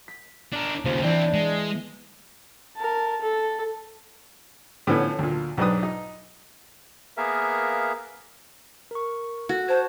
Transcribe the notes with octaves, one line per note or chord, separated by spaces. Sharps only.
B6
D4 A#4
D#2 C#3 F3
E3 C4 D4 E4
G#3
A#4 A5
A4
A2 D3 F3 B3 C#4
D2 A#2
B1 G#2 D4 B4 D#6
D#4
A#3 B3 G#4 A#4 E5 F5
A#4 C#6
F#4 A4
C5 A5 G#6